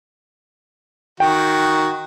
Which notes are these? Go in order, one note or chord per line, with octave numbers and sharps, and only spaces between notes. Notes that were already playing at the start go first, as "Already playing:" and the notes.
D#3 F#4 G5